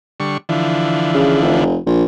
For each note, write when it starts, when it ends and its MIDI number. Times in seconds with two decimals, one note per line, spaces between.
0.20 0.37 50
0.20 0.37 55
0.20 0.37 85
0.49 1.64 50
0.49 1.64 52
0.49 1.64 53
1.14 1.42 49
1.42 1.77 29
1.86 2.04 34